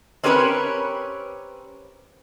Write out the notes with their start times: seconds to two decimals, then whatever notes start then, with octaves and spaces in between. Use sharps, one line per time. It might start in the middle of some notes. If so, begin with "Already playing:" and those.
0.24 C4 C#4 G4 A#4 B4 C#5